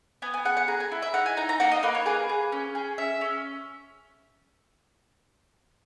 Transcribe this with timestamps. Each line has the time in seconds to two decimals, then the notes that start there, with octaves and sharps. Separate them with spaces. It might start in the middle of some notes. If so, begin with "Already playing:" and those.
0.22 B3 G#5
0.34 G#5
0.45 G#4 F#5
0.57 F#5
0.68 G#4 A#5
0.80 G#5
0.92 E4
1.02 E5
1.14 D#4 F#5
1.26 G#5
1.37 D#4 A#5
1.49 A#5
1.60 A#3 F#5
1.71 D#5
1.83 A#3 B4
1.95 C#5
2.06 G#4 B4
2.29 G#4
2.52 C#4
2.75 G#4
2.98 C#4 E5
3.21 C#4